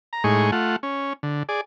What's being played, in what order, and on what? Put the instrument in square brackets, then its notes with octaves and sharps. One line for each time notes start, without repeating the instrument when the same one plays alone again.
[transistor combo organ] A#5
A2 G#3 D#4 G#4 C#6
A3 F4 F#5
C#4
D3
G#4 D5